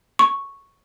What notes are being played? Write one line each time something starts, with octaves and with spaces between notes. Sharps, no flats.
C#6